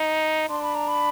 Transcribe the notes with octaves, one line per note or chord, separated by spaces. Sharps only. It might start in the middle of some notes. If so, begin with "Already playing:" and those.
Already playing: D#4
D4 C6
B5
A#5
B5